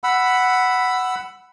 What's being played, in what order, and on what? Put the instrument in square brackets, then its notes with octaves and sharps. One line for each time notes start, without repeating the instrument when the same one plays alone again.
[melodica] F#5 B5 E6